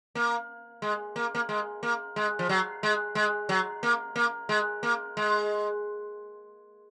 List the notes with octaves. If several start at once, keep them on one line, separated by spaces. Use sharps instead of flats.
A#3
G#3
A#3
A#3
G#3
A#3
G#3
F3
F#3
G#3
G#3
F#3
A#3
A#3
G#3
A#3
G#3